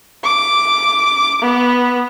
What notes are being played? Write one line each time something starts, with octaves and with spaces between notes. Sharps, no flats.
D6
B3